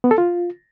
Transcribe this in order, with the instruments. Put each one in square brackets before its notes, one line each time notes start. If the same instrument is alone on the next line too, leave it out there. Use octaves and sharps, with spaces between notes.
[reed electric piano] B3
A4
F4